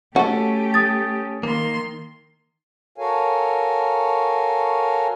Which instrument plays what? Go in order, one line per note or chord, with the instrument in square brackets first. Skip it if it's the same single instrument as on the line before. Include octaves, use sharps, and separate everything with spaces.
[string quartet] A3 G4 [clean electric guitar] C#4 A4 [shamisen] F#4
[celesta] D#6 A6
[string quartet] D#3 C6 [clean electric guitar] A#3
[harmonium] F#4 A4 A#4 C#5 F5 G#5